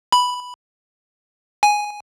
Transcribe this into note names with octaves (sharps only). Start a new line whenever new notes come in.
B5
G#5